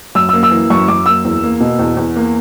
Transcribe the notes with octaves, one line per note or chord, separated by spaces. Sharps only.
F#2 E6
A#3 E6
E6
E3
F#2 C#6
F#2 D6
A#3 E6
E2
A#3
B2
E2
E2
A#3